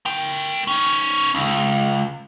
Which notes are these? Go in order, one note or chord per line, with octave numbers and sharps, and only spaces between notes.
A3 G5
C#4 D#4
C#2